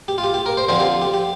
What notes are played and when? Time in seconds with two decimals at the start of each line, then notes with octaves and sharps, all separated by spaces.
0.08 G4
0.18 F4
0.24 G4
0.34 G4
0.46 A#4
0.57 C5
0.68 D3 F3 C4 F4 C5
0.80 G4
1.02 G4
1.14 G4